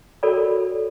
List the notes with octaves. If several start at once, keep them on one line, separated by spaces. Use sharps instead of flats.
F#4 A4 A#4 C#5 D5 B5